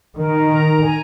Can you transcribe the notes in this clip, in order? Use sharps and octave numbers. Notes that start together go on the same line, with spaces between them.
D#3 A#4
A#5
G#5